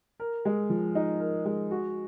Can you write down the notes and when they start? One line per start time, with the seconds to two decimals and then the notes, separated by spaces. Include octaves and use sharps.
0.20 A#4
0.45 G#3
0.70 F3
0.95 D#4
1.20 A#4
1.45 G#3
1.71 F#4